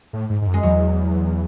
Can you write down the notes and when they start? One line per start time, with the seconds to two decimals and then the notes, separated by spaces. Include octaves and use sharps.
0.13 A2
0.30 G#2
0.42 G#2
0.47 F#2
0.54 G#3
0.63 E2 F#3